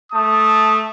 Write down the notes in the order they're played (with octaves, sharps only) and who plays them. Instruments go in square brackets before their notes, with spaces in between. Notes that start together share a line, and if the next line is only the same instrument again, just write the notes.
[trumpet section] A3 A5 D#6